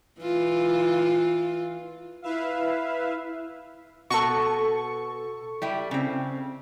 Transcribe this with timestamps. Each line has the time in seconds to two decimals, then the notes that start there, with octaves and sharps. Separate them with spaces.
0.21 E3 F4
2.22 E4 B4 E5 F5
4.10 B2 F#4 A4 C#6
5.62 G3 E4 G4
5.91 C#3 C4